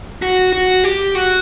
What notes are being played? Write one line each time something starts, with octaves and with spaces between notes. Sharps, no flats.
F#4
F#4
G4
F#4